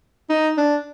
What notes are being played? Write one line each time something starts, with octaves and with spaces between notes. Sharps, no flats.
D#4
D4